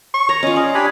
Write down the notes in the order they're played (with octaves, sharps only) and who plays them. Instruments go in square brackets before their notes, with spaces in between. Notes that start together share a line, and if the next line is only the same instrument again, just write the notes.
[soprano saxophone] C#6
[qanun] C#5 A#5
[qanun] C#4 F4 [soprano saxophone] D#5
[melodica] G#4 [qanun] D5
[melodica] D4 G#5 B5 [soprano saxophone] G4